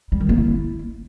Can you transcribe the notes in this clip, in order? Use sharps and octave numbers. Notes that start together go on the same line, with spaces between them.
G3
D#3
A#3
E4